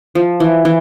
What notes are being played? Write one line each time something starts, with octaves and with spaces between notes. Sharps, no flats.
F3
E3
E3